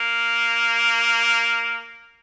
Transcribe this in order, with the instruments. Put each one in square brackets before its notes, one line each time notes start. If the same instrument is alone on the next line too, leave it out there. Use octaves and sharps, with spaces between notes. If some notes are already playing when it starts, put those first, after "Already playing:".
Already playing: [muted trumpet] A#3